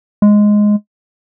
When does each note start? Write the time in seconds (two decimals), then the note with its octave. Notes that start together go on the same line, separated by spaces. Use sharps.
0.22 G#3